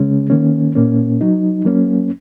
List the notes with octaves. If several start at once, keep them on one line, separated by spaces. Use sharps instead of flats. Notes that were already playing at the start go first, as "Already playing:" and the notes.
Already playing: C#3 G#3 C#4
D#3 A#3 C#4
A#2 A#3 C#4
F#3 D#4
F#3 A#3 C#4